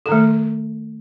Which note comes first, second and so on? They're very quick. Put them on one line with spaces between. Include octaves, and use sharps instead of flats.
A4 D#3 A3